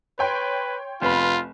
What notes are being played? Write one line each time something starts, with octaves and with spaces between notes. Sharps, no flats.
B4 C#5 G5 C6
F1 B3 F4 B5